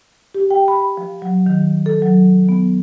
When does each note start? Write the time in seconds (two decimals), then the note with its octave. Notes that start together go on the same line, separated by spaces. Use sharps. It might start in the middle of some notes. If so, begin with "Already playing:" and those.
0.35 G4
0.51 G5
0.68 B5
0.97 F3
1.22 F#3
1.46 D#3
1.86 A4
2.02 F#3
2.49 B3